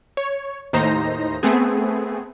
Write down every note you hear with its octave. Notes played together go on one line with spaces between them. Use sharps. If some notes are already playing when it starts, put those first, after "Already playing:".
C#5
D#2 A2 D#4 C5 A#5 A#6
A3 B3 C4 G#4